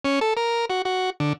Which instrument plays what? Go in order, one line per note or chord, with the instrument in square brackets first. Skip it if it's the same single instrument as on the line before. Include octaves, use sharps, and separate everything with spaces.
[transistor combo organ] C#4
A4
A#4
F#4
F#4
D3